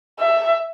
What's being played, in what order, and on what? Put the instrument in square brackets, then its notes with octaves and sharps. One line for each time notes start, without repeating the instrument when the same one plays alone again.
[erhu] E5